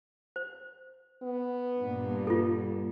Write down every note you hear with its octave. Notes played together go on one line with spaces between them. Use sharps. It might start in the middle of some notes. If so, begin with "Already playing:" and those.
C5
B3
G2 A#2
F4 A4